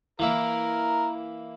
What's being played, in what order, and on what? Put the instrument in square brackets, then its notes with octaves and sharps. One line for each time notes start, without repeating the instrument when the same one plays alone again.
[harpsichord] E3 A#3 E4 [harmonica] A#4